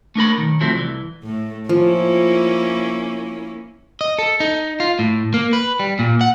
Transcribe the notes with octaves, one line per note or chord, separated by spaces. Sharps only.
A3 D4 A#4 B5
B1 D#3
F3 F#3 A3 C4 E4
C2 E3
A2 A3
F3 A#3 C#4 E4
D#5
A4
D#4
F4
A2
A#3
B4
G3
A#2
F#5